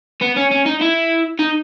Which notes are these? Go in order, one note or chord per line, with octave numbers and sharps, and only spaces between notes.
B3
C#4
C#4
D#4
E4
D#4